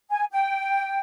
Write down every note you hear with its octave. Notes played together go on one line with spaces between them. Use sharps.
G#5
G5